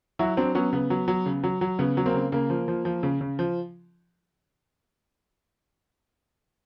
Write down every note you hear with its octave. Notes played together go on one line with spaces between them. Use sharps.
F#3 E4 F#4
F#3 C4 D4
F#3 B3 C#4
C#3 B3
F#3
F#3
C#3
F#3
F#3
C#3 B3
F#3
A#3 C4
C#3
C#3 A#3
F3
F3
F3
C#3
C#3
F3